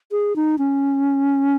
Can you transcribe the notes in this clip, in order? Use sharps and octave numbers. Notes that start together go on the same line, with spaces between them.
G#4
D#4
C#4